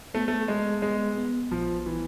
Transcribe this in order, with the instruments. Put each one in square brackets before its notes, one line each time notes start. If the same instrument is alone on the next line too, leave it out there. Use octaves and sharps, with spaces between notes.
[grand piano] A3 [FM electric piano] B3
[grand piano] A3
[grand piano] G#3 [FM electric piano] B3
[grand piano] G#3 [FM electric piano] B3
[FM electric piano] B3
[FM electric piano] A#1 [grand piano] F3
[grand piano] E3